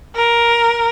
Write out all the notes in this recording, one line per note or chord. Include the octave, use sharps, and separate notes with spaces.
A#4